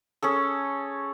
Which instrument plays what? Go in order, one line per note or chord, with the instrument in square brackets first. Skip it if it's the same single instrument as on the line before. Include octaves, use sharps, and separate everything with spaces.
[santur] C#4 G#4 A4